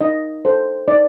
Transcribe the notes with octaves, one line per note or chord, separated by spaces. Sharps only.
D#4 D#5
A4 C5
D#4 D5